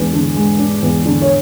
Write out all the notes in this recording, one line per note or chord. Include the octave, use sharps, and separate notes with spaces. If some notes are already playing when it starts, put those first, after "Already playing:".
Already playing: E2 G#3 D4
D3
G#3
D4
E2
D3
C#5